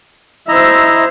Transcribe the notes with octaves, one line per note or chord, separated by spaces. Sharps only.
E4 C5 D#5 E5 A#5